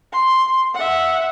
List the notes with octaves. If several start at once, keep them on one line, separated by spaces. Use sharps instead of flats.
C6
E5 F#5